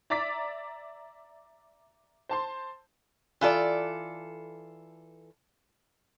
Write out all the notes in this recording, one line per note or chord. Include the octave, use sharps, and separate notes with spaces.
D5 E5 A#5 D6 A6 B6
C5 A5 C6
E3 F4 A4 D5